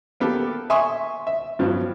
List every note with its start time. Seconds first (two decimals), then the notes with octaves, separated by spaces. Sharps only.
0.20 A#3 B3 G4 A4
0.70 E5 G#5 C6 C#6 D#6
1.27 E5
1.59 G2 F3 F#3 B3